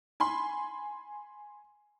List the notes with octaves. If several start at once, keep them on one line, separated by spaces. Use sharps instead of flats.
G#5 B5 C6